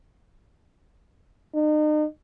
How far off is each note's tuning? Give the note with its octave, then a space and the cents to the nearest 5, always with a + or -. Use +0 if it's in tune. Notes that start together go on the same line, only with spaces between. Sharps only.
D#4 -40